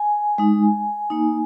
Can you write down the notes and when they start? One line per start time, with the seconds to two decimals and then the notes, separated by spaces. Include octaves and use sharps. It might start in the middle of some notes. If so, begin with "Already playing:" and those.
Already playing: G#5
0.38 G#3 D#4
1.10 A#3 D#4